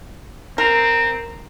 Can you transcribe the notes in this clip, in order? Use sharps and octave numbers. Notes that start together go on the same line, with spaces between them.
C4 A#4